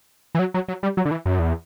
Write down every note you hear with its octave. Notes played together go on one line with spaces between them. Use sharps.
E3
F#3
F#3
F#3
G3
F#3
D3
E3
F#2
E2